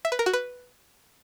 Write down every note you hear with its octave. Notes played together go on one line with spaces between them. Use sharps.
E5
B4
A#4
F#4
B4